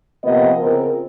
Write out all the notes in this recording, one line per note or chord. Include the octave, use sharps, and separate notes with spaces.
C3 F3 A#3 B3 D#5
C#3 C4 F4 A#4